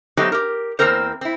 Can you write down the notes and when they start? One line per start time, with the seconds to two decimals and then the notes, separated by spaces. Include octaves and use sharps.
0.17 F#3 A3 B3 C4 D#4 G4
0.32 G4 A#4
0.79 E2 E3 A#3 C4 A#4 C5
1.21 C4 E4